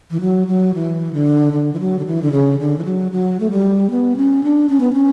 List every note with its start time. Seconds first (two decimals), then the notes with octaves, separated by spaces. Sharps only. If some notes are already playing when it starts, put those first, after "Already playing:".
0.11 E3
0.21 F#3
0.48 F#3
0.74 E3
1.13 D3
1.53 D3
1.73 E3
1.80 F#3
1.99 D3
2.06 E3
2.22 D3
2.32 C#3
2.59 D3
2.78 E3
2.85 F#3
3.12 F#3
3.40 A3
3.51 G3
3.90 B3
4.16 C#4
4.44 D4
4.69 C#4
4.80 B3
4.93 C#4